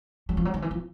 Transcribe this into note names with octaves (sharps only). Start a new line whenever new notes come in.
F#3
F3
F#3
D#3
E3
F3